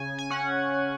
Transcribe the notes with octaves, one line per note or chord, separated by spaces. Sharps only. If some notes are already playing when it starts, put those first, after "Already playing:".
Already playing: C#3 G#5
G#5
C#4 F#5